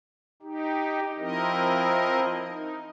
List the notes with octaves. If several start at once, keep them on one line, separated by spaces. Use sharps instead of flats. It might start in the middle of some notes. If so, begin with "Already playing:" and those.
D#4 G4
F3 C4 E4 A#4 D#5
D#4